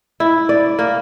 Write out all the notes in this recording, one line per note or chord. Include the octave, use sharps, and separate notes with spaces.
E4
D5
A#3